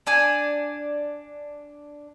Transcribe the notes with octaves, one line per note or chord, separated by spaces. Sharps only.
D4 D5 G#5